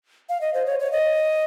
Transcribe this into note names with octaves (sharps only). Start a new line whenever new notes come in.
F5
D#5
C5
C#5
C#5
D#5